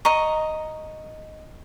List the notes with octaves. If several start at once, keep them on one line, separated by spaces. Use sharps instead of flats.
D#5 A#5 C#6